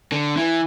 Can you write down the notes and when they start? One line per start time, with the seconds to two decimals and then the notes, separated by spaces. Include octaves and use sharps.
0.12 D3
0.37 E3